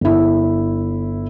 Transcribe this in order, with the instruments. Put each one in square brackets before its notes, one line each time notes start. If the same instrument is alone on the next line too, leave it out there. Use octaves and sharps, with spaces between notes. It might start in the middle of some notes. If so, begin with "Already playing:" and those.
[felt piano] G1 E4